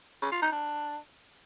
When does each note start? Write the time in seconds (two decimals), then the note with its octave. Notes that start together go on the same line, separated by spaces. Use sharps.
0.22 C#3
0.32 F4
0.42 D#4
0.52 D4